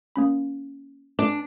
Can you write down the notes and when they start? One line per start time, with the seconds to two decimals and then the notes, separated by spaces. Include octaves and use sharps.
0.16 A#3 C#4 B5
1.19 D4 D6